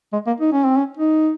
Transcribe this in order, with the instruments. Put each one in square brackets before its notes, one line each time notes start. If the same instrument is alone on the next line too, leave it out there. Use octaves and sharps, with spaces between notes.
[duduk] G#3
A#3
D#4
C#4
C4
C#4
D#4